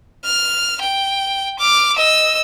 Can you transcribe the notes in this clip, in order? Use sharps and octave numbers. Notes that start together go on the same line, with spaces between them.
F6
G5
D6 F6
D#5 E6